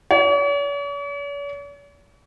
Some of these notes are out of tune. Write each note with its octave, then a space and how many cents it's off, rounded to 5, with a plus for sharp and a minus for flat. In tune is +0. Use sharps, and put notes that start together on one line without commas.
C#5 +45